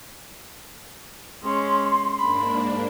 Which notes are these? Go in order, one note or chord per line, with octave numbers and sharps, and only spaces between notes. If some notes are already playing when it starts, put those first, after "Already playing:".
G#3 C#4 C6
G#2 A#3 D4 B5